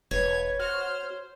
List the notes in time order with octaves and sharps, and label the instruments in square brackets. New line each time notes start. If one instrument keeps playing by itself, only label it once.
[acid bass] E1 [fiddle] B4 [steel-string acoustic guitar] C#5 [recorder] G#6
[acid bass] F#4 [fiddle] C5 [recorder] F6